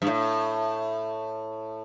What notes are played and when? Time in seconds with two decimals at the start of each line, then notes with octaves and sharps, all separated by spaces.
0.02 G2
0.07 A2